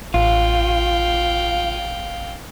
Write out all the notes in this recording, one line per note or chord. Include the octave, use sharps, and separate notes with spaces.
A1 F4 F5 G5